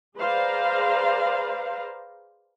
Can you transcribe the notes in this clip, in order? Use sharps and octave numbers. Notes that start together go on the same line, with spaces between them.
G#4 B4 C5 D5 F5 A#5